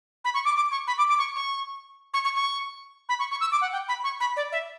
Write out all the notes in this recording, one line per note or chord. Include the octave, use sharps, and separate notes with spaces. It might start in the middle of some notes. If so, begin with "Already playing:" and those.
B5
C#6
D6
D6
C#6
B5
D6
D6
C#6
C#6
C#6
C#6
C#6
B5
C#6
C#6
E6
D6
F#5
G5
B5
C#6
B5
D5
E5